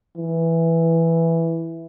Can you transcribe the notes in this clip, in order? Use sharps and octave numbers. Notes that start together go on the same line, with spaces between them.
E3